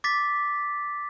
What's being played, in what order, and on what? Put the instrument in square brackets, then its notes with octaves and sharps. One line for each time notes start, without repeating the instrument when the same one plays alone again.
[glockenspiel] D6 A6 B6